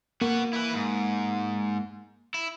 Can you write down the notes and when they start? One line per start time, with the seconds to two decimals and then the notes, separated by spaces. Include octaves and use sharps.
0.21 A#3 B3 F#4
0.53 E4 B4
0.74 G#2
2.34 E4